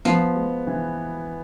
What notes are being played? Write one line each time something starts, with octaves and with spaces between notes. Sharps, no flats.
F3 B3
G#3
E3